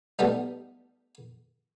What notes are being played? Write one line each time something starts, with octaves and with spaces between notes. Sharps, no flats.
G3 A3 B3 D#4